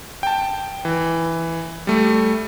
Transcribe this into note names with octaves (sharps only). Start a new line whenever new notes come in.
G5 A5
E3
G3 A3